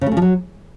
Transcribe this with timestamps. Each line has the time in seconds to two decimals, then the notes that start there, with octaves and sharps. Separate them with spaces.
0.01 C#3
0.07 A3
0.12 C#3
0.17 F3
0.22 F#3